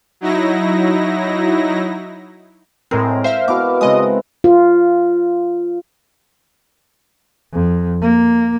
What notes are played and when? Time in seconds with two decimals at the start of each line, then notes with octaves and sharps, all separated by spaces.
0.21 F#3 D#4 E4 A#6
2.91 A2 G#3 C4 A#4
3.24 C5 E5 F5 F6
3.48 B2 E4 D6 F6
3.81 C#3 G#3 B3 C4 D#5 D#6
4.44 F4
7.53 F2
8.01 A#3